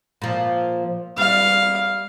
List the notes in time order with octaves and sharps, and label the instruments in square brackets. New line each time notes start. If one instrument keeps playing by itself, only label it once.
[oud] A#2 F3
[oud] G3 [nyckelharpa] F5